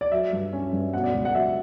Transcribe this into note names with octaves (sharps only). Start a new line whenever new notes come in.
D5
F#3 E5
G2
C#4
G2
B2 F#5
D5
C#2
F#5
F#3 E5